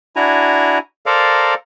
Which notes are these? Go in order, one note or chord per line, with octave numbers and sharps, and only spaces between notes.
D4 E4 F#4 G#5 A#5
A4 A#4 C5 D5 F5 A#5